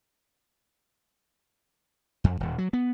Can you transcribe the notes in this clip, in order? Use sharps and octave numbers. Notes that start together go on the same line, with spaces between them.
F2
D#1
F#3
B3